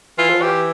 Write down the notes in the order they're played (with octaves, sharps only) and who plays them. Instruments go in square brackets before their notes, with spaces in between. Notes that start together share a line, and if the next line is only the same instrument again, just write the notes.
[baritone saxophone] E3 [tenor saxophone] F4
[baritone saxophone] F3
[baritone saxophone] E3 [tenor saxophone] G4